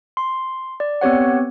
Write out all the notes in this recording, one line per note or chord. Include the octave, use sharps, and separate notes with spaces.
C6
D5
B3 C4 G4 C#5 F#5